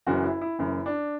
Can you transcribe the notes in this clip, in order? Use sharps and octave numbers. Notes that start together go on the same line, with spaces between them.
F#1 F#2 E3 F#4
E4
E4
F#1 F#2 E3 E4
D4